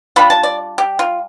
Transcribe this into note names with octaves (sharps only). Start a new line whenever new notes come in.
G3 D4 F4 B5
A5
D5
G4
F4